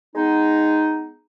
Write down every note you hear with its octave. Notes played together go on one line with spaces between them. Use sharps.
G#3 B3 D#4